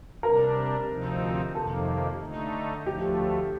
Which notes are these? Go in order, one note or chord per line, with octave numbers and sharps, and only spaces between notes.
C3 G3 D4 A#4
D2 C3 F3 C4 D#4
F2 C3 D#3 A#3 A4
D3 A3 D#4
D2 D3 F3 A3 G4